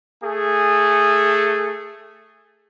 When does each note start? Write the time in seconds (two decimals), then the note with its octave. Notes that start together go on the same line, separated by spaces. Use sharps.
0.24 A3 G#4